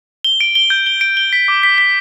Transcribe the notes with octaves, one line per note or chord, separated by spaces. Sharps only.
G7
D7
G7
G6
G7
D7
G7
B6
D6
B6
B6